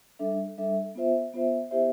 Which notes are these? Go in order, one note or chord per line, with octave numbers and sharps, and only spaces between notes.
G3 D4 A4 E5
G3 D4 A4 E5
B3 F4 C5 E5
B3 F4 C5 E5
B3 E4 G4 C5 E5